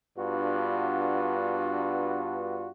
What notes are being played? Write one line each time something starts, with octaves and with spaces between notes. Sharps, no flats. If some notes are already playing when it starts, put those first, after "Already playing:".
G2 B3 D4 F4 F#4